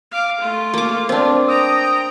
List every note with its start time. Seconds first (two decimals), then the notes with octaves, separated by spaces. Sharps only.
0.11 F5 D6
0.41 A3 F4
0.74 A#3 D6
1.09 C4 D4
1.48 G5 A#5 D#6